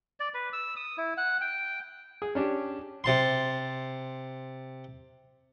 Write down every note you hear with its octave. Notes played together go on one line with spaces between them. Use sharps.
D5
B4
E6
D#6
E4
F#5
G5
G#4
C#4 D4 G4
C3 A5 C6